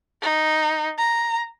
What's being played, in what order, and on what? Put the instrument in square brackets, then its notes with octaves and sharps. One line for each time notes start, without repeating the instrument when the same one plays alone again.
[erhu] D#4
A#5